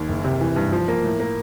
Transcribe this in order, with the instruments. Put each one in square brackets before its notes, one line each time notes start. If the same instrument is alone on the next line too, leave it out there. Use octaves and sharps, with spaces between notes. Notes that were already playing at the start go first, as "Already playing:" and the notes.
Already playing: [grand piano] D#2
F#1
C3
E3
G2
F3
A#3
A2
A#3